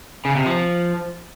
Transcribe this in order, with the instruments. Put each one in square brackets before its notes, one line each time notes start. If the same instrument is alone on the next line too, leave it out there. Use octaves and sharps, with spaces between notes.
[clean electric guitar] C#3
C3
F3